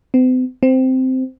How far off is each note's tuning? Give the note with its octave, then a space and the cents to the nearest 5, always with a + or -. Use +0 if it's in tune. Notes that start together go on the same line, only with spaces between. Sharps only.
C4 -45
C4 -10